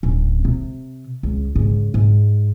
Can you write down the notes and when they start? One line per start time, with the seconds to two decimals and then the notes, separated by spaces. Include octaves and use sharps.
0.03 D1 C#4
0.45 C3
1.23 C#2
1.55 G#2 C#3
1.94 G#2